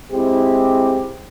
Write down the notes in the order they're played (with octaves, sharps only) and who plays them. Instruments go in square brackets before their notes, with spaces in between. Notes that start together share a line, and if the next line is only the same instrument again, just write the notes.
[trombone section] G#3 C4 E4 G4